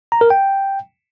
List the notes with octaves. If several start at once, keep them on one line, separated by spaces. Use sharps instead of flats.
A#5
A#4
G5